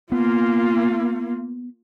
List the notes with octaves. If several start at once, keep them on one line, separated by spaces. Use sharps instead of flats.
A#3 B3 F4